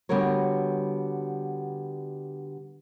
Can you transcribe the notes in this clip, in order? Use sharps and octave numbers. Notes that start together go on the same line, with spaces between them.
D3 G3 B3 F#4 A#4 C#5